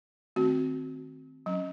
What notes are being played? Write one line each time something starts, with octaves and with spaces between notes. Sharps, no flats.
D#3 A3 C4 F#4
F#3 C#4